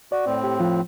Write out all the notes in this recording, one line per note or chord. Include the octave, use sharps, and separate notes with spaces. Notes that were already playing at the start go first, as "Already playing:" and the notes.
F#4 D5
A2 C4
G4
F3 F4